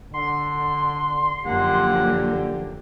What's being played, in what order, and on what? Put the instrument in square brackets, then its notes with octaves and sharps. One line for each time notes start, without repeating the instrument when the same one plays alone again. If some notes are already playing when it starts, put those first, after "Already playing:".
[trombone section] D3 [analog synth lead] C6
[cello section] F#2 F3 A#3 [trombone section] D3 G4 [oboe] F#5